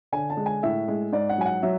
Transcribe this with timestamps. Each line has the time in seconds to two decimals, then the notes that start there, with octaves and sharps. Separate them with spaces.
0.12 D3 G#5
0.30 A5
0.37 G#3
0.46 G#5
0.63 A2 E5
0.88 G#3
1.12 G#2 D5
1.29 F#5
1.38 F#3 G#5
1.46 F#5
1.63 F#3 E5